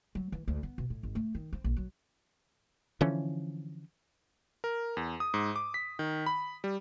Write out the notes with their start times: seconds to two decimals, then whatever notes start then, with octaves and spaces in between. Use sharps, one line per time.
0.15 F#3
0.32 E3
0.48 D2
0.63 B3
0.78 B2
0.90 A2
1.03 G#1
1.15 A3
1.35 D#3
1.53 C4
1.64 A#1
1.77 F#3
3.01 D3 E3 F3 C#4
4.64 A#4
4.97 E2
5.20 D#6
5.34 G#2
5.56 D6
5.74 B6
5.99 D#3
6.26 B5
6.64 G3